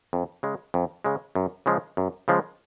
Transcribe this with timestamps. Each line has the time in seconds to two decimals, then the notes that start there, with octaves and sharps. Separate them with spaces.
0.13 F2
0.43 C#3 G#3
0.74 F2
1.04 C#3 G#3
1.35 F#2
1.66 C#3 F3 G#3
1.97 F#2
2.28 C#3 F3 G#3